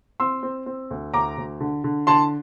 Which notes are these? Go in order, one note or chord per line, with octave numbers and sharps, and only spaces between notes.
C4 C6 E6
C4
C4
D2
D2 A#5 D6
D2
D3
D3
D3 A5 C6